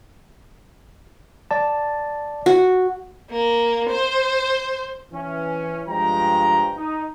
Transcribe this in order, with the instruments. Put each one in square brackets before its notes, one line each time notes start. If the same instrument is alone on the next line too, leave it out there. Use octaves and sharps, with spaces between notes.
[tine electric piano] D5 A5
[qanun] F#4
[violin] A#3
C5
[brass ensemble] E3 C#4
G2 F3 G#3 G5 A#5
D#4